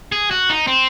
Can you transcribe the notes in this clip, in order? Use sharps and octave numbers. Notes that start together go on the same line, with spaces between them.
G#4
F#4
D#4
C4